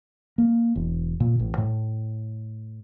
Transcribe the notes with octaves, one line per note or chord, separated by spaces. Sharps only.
A#3
E1
A#2
A1
A2